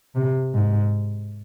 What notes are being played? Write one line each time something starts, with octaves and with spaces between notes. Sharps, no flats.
C3
G#2